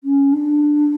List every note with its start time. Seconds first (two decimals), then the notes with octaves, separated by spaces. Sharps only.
0.04 C#4
0.33 D4